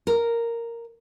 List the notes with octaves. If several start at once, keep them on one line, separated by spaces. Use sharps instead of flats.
A#4